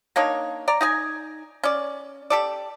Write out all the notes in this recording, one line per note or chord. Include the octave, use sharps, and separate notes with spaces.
A#3 D4 D#4 C#5
D5 A#5
D#4 D#5 G#5
C#4 D5
G4 A4 D5